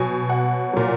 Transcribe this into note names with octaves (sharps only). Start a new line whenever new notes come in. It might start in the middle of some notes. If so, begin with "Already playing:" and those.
Already playing: B2 F#3 G#5
F#5
A#2 F#3